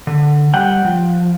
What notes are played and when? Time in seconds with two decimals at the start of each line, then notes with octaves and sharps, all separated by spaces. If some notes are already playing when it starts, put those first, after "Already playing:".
0.07 D3
0.54 G3 F#5 G5
0.85 F3